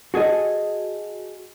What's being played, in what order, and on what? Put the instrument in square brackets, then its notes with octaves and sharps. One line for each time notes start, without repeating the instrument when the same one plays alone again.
[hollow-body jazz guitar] F#4 G#4 A4 D#5